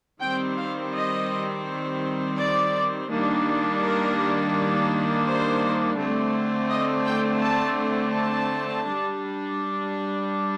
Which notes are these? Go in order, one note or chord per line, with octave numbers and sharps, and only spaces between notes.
D#3 G3 C4 G5
F5
D#5
D5
D#3 G3 A#3 D4
A#4
C5
D3 A3 C4
D#5
G5
A5
A5
G3 D4